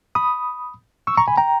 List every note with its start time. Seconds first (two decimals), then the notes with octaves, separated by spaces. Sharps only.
0.15 B5 D#6
1.07 C#6 E6
1.17 A#5 C#6
1.28 G#5 B5
1.37 G5 A#5